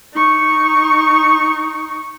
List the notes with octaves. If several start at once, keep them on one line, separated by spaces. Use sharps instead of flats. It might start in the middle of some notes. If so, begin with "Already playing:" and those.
D#4 C#6